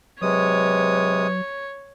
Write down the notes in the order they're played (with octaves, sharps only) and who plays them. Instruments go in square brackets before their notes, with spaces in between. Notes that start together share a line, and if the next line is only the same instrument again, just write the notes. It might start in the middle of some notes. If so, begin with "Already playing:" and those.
[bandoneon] C3 G#3 D#6 [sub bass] F#3 [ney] B4 [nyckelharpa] C#5